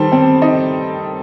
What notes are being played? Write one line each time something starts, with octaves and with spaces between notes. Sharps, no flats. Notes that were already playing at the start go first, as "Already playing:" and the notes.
Already playing: D#3 G3 A4 C5
C4
D#4